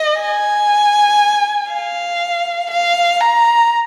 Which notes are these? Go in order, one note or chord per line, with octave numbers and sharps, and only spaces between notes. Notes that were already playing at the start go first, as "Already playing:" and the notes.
Already playing: D#5
G#5
F5
F5
A#5